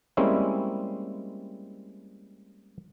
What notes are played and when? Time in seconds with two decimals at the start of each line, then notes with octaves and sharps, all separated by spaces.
0.17 G3 G#3 A#3 C4 C#4 E4